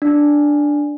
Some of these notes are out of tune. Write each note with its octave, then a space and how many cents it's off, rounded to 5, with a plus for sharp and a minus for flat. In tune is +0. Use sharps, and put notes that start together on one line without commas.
D4 +0